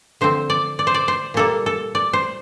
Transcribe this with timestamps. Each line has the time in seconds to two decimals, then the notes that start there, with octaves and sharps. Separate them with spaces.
0.21 D3 F3 C4 C5
0.50 D5
0.79 D5
0.87 C5
0.94 D5
1.08 C5
1.34 A#2 G3 A#3 A4
1.66 A4
1.95 D5
2.13 C5